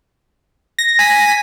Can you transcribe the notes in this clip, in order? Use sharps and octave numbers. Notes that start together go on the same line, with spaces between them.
A#6
G#5 B6